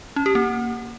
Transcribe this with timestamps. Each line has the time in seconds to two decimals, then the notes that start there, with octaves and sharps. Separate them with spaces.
0.16 C#4
0.26 G4
0.35 A#3